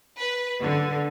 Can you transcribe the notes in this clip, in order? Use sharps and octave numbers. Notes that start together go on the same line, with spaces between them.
B4
D3